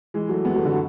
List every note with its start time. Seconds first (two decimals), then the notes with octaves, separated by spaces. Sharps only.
0.14 E3 G#3
0.29 F#3 A3
0.45 G#3 B3
0.55 F#3 A3
0.65 B2 D3